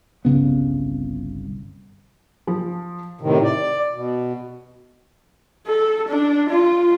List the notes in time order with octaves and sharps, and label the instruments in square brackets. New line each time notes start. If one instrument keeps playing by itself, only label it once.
[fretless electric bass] G1 C2 C#3 B3
[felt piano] F3
[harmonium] A2 C3 D#3
D5
B2
[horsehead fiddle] A4
D4
F4